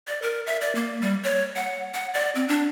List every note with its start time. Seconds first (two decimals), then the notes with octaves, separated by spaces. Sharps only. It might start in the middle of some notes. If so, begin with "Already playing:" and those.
0.07 D5
0.22 A#4
0.47 E5
0.61 D5
0.75 A#3
1.01 G3
1.24 C#5
1.56 F#5
1.94 F#5
2.14 D5
2.35 C4
2.48 D4